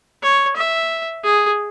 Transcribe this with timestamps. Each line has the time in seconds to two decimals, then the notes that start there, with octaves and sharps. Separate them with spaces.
0.23 C#5
0.56 E5
1.24 G#4